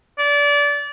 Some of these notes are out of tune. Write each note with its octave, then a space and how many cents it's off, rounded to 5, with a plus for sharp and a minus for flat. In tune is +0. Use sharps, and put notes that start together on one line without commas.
D5 -25